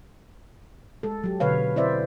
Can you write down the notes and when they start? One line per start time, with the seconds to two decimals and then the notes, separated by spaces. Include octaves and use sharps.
1.03 G#3 A4
1.24 F#3 G4
1.40 B2 D3 B4 C#5 F5
1.76 C4 E4 B4 C5 D5 E5